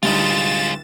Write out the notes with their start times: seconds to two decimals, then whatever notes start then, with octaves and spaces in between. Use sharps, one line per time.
0.03 D1 D2 G3 G#3 D#4 F4 A6 E7